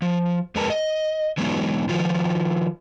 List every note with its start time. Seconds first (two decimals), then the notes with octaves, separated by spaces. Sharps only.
0.02 F3
0.55 F2 G#3 A#4 B4 A5
0.70 D#5
1.37 D3 E3 F#3 G#3 B3 D#4
1.89 D#3 F3 F4